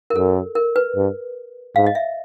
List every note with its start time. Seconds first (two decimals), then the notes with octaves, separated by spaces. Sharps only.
0.10 A#4
0.16 F#2 A4
0.55 A#4
0.76 B4
0.96 G2
1.76 G#2 F5
1.86 D#5
1.95 E5